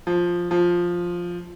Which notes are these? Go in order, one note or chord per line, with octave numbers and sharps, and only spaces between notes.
F3
F3